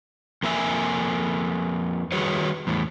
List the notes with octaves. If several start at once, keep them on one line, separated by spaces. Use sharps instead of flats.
F2 A#3 E4 E5 G#5
D#3 G3 F#4 G#4 B4 C#5
E2 A2